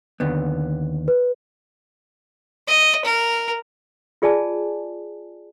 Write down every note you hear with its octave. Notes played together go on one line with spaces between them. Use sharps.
D#2 D3 B3
B4
D#5
A#4
F4 G#4 D5 G#5 A5